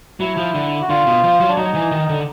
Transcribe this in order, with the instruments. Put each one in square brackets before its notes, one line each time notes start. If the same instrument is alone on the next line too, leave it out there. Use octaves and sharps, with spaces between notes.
[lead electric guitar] F#3 [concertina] E4
[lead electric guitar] F3
D3
[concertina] F#4
[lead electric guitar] D3 [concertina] F4
[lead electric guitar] B2
F3
F#3
[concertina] D4
[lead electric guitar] F#3 [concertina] D#4
[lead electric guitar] E3
D#3
D3